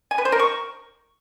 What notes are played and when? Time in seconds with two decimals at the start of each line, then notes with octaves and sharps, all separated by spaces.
0.11 G#5
0.18 B4
0.25 C5
0.32 A#4
0.39 C#6